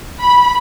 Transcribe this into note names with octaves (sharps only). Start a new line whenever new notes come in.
B5